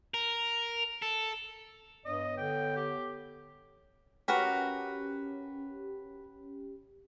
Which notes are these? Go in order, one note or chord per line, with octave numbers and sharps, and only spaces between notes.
A#4
A4
G2 B3 C#5 D#5
D3 G5
G4
C#4 F#4 G4 A#4 B4